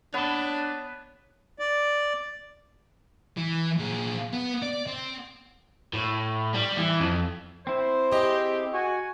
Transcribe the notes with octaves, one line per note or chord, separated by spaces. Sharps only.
B3 D4 B4 C#5 A5
D5
E3
A#2 G#4
B3
D5
C4
A2
G3
E3
F2
C4 E4 C5
G4 G#4 D#5
F#4 G#5 C#6